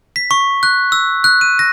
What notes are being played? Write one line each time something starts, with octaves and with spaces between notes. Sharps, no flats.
B6
C#6
F#6
E6
F#6
D#7
A#6